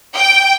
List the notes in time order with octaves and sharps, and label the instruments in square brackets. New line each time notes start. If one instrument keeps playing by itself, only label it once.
[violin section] G5